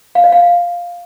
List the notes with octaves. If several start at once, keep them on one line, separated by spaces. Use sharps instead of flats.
F5
D#5
F5